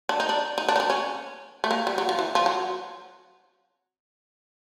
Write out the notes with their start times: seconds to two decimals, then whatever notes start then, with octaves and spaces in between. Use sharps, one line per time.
0.09 D4
0.20 D#4
0.29 D4
0.58 D#4
0.69 D4
0.76 D#4
0.80 D4
0.90 C#4
1.64 A3
1.71 A#3
1.87 G3
1.98 F#3
2.09 F3
2.19 E3
2.35 F3
2.46 F#3